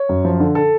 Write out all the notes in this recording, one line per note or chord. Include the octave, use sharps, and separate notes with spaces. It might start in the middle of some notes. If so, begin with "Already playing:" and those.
Already playing: C#5
F#2
F3
D3
A4